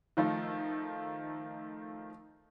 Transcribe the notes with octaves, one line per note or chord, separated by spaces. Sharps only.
D#3 F3 A3 D#4